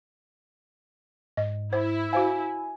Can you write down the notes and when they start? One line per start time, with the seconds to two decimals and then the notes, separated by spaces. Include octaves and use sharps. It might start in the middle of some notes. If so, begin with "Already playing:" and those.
1.37 G#2 D#5
1.73 E4 C5
2.13 F#4 C5 F5 G#5